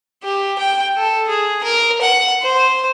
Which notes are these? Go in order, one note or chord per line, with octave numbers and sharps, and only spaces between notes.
G4
G5
A4
G#4
A#4
F#5
C5